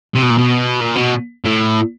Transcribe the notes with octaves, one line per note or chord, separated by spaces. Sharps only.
C3
B2
A#2
B2
A#2
B2
A2